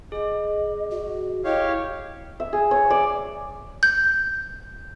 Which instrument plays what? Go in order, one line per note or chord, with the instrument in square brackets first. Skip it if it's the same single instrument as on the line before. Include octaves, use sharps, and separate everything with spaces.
[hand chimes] G#4 [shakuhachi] D#5
[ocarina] F#4
[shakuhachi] E4 [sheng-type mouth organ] G4 C#5 F5 [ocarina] D#5
[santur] E5
G#4
C#5
D5
[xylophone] G6